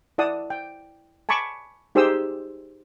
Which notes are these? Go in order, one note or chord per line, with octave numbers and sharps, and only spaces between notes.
E4 D5 F#5 A5 D#6
G5
G#5 A5 B5 C#6 D6
D#4 G4 G#4 C5 D#6 E6